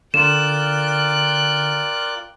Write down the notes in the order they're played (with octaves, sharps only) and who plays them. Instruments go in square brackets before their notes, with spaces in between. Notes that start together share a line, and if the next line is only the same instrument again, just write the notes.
[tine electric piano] D3 C6 [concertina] F4 A#4 D5 [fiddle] G5 F#6 [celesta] E7